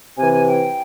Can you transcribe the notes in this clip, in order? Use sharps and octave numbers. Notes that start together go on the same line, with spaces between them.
C3 E3 G#5
G#5
G5